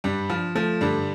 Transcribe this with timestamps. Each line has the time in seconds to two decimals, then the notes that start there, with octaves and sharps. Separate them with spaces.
0.04 G2 G3 D4
0.29 F3 F4
0.55 F3 A3
0.81 G2 D3 G3